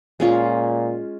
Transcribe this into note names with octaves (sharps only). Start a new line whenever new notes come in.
A#2 G#3 C#4 F4